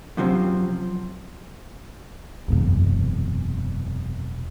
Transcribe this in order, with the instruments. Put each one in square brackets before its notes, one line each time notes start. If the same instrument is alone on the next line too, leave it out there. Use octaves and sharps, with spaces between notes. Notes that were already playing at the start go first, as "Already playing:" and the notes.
[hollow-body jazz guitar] F#2 C3 F3 C4
[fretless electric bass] E1 [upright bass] F#2 C3